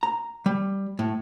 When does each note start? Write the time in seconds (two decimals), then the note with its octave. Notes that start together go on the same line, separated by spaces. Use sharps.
0.03 A#5
0.46 G3
0.99 A2